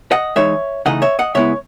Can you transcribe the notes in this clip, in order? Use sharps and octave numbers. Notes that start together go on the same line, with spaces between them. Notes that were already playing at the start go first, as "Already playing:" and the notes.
D#5 F#5
E3 G#3 D#4 C#5 E5
C#3 E3 A3 D#4 D#5 F#5
C#5 E5
D#5 F#5
C#3 G#3 B3 E4 C#5 E5